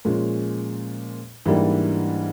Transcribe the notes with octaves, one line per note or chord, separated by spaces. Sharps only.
A#2 F3 G#3 C#4
G#2 E3 G3 A#3 D4